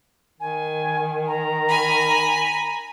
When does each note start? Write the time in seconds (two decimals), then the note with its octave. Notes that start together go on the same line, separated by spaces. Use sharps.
0.40 D#3 G#5
1.27 A#5
1.68 G#5 B5